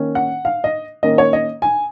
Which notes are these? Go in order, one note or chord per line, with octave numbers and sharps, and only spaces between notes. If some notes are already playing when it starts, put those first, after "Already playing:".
Already playing: D#3 A#3 C#4
F#5
F5
D#5
D#3 A#3 C#4 D#5
C#5
D#5
G#5